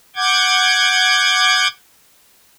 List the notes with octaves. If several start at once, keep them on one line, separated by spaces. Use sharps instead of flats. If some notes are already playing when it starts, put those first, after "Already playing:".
F#5 D6 G6 G#6